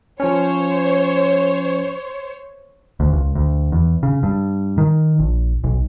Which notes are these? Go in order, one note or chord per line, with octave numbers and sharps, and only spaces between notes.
F3 C#4 C5 C#5
D2
C#2
D2
E2
C#3
G2
D#3
A#1
B1